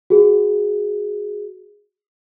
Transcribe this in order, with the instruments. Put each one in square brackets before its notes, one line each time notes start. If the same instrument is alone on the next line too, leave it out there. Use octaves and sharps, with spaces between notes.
[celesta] F#4 G#4